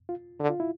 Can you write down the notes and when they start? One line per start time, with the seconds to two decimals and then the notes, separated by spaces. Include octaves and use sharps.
0.09 F4
0.39 D3
0.49 F4
0.60 E4